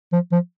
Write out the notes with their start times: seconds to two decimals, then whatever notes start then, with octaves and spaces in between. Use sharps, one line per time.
0.13 F3
0.32 F3